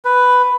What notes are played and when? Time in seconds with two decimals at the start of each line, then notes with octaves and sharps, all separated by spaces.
0.05 B4